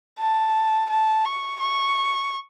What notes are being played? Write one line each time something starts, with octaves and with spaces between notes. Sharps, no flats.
A5
A5
C#6
C#6